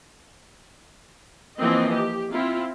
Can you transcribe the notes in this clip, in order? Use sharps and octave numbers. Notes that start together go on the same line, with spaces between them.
E3 F3 A#3 C4 D#5
G4
C4 E4 F4